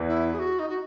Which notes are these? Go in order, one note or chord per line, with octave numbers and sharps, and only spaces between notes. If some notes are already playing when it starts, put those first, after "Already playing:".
Already playing: E2 E3
E4
G#4
F#4
D#4
F#4